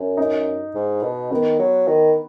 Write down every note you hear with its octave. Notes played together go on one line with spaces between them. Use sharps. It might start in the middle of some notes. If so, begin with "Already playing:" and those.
Already playing: F#2
D#4
G#2
B2
D#3 B3
F#3
D#3